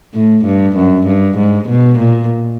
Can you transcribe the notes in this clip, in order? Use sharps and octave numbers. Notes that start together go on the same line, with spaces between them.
A2
G2
F#2
G2
G#2
B2
A#2